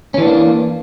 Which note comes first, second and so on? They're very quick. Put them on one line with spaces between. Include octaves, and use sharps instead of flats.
C#4 E3 D4 A#3